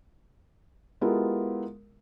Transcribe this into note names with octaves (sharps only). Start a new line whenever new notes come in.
G#3 B3 E4 F4 G4 A#4